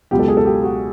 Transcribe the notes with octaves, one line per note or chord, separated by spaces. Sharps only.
C#2 B2 F#3 B3 G4
A4
G#4
A4
G4
F#4